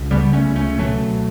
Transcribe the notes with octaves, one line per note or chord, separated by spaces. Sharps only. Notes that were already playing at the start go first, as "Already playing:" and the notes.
Already playing: C#2
C#3 G3 B3
A3 C#4
C#2
A3 C#4
B2 F#3 A3